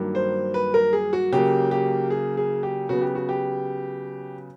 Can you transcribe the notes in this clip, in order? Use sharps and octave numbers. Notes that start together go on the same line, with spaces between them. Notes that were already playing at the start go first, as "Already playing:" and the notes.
Already playing: G2 D#3 F#3 A#3
C5
B4
A#4
G#4
F#4
C#3 F#3 A#3 G4
G4
G#4
G#4
G4
C#3 F#3 B3 F#4
G4
F#4
G4